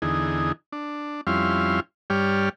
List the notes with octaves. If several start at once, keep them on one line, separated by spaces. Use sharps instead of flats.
E2 D3 D#4 G#4
D4
F2 G3 C#4 E4 F5 C6
G2 G3 G4 C#5 D5 F6